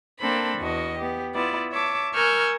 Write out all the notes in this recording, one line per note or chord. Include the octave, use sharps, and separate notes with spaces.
A#3 C4 D4 A4 B5
E2 F#4 D#5
B3 G4
B3 E4 F4 D5
C#5 E5 A5 D6
A#4 G#5 C#6 E6 F6 G6